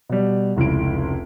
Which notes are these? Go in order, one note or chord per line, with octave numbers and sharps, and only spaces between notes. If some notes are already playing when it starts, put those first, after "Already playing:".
B2 G3
F1 C#2 E4 D7